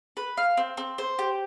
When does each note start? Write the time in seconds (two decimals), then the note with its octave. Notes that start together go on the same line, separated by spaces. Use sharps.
0.17 B4
0.37 F5
0.57 C4
0.77 C4
0.98 C5
1.19 G4